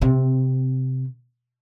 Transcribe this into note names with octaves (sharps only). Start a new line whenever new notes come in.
C3 C4